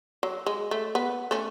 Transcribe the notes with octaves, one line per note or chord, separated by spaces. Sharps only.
F#3
G#3
A3
B3
A3 C#4